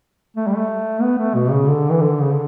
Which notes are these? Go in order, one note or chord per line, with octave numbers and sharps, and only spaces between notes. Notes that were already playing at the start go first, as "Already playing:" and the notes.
A3
G3
A3
B3
A3
B2
C#3
D3
E3
D3
C#3
D3